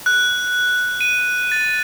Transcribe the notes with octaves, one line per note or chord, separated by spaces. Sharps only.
F#6
D#7
A6